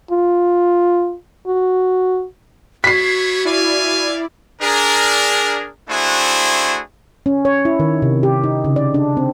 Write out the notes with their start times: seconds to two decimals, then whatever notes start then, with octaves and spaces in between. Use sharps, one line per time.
0.11 F4
1.47 F#4
2.84 B3 E4 F#4 C#5 B6 C7
3.45 E4 D5 F5 G#5
4.62 D4 G#4 A#4
5.89 A3 D4 E4 F#4 G#4 C5
7.26 C#4
7.45 C#5
7.65 E4
7.80 D#3
8.02 C3
8.23 G4
8.44 D#4
8.65 C#3
8.76 D5
8.94 D4
9.17 C4